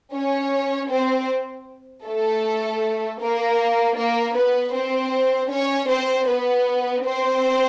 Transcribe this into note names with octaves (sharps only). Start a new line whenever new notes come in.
C#4 C#5
C4 C5
A3 A4
A#3 A#4
A#3 A#4
B3 B4
C4 C5
C#4 C#5
C4 C5
B3 B4
C4 C5